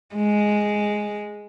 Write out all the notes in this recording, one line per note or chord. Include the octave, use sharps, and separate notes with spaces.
G#3